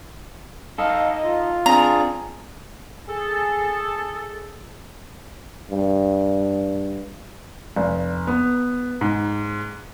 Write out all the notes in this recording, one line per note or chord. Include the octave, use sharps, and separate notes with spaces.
D#4 A4 D#5 F5
F4
C4 D4 G#4 A#5
G#4 A4
G2
F1
B3
G#2